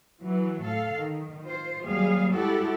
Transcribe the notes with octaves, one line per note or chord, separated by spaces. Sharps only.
E3 F#3
A2 A4 F5
D#3
F4 C5
D#2 F#3 G3 G#4 F5
G3 G#3 E4 F#4 G4 A4